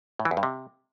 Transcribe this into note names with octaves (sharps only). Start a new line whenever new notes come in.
A2
E3
E2
G2
C3